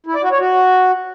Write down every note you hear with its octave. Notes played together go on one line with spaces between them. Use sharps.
E4
D5
F#4
C#5
F#4